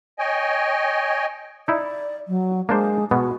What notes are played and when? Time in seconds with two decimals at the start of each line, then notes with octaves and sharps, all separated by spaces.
0.19 C#5 D#5 G5 G#5
1.68 D#4 E4 D5
2.28 F#3
2.69 G#3 A#3 D4 C5
3.11 B2 G#3 B3 F#4